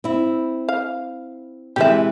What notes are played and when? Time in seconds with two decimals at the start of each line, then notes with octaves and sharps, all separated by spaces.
0.04 C4 E4
0.69 F5
1.76 C3 E3 G#3 G4 E5